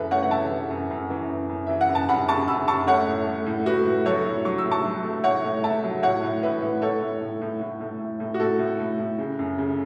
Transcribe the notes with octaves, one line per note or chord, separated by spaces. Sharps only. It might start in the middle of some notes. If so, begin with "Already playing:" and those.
Already playing: F#2 E3 A4 B4 E5
A3 C#5 F#5
F#5
E3 E5 A5
E3
F#2
F#2
E3
F#2
F#2
E3 E5
F#5
F#2
A5
F#2 F#5 B5
F#2 A5 C#6
F#2 B5 E6
F#2 A5 C#6
A3 C#5 F#5
A2
A3
A2
A3 F#4 B4
A2
F#3 A4 C#5
A2
F#3 C#6
E6
A2
A5 C#6
F#3
A3
A2 C#5 F#5
A2
A3 E5 A5
F#3
A2 C#5 F#5
A2
E3 B4 E5
A2
A2 A4 C#5
A2
A2
A2
A2
A2
A2
A2
F#4
A2 A4
A2
A2
A2
C#3
F#2
C#3